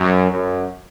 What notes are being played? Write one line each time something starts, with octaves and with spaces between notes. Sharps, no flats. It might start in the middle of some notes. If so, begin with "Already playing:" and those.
Already playing: F#2
F#2